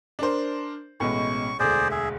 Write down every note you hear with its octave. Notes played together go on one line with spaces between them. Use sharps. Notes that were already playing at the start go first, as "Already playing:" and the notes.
D4 A#4 C5
A1 B2 G#3 C#6
E1 D2 G#4 C5 D5
G#4 E5